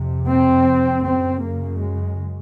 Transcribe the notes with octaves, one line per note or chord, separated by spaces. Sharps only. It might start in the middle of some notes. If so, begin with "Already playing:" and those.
Already playing: F2 C3
C4
F#2 C#3 C4
A#3
G#3